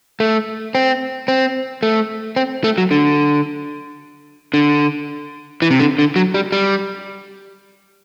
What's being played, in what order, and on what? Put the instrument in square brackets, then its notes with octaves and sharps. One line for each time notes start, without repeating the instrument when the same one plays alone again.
[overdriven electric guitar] A3
C4
C4
A3
C4
A3
F#3
D3
D3
E3
C3
D3
D3
F#3
G3
G3